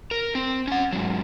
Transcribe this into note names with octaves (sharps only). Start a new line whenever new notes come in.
A#4
C4
C#4 F#5
G#2 F#3